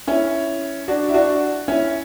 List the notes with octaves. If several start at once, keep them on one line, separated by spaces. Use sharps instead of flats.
C#4 E4
D4 F#4
E4
D4 F#4
C#4 E4